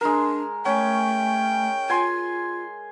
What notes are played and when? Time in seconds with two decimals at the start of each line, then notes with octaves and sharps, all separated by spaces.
0.01 G#3 D4 A#4
0.66 A3 C#4 G5
1.90 F4 G#5 C6